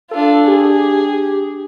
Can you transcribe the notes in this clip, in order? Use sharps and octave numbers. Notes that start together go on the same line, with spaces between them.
D4 F4 A4
G4 G#4